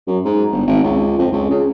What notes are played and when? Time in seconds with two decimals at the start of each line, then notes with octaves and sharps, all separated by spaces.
0.07 F#2
0.25 G#2
0.52 G1
0.67 G#1
0.83 C#2
1.18 F2
1.32 C#2
1.50 C#3